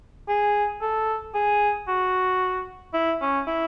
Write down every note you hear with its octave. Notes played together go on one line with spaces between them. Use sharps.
G#4
A4
G#4
F#4
E4
C#4
E4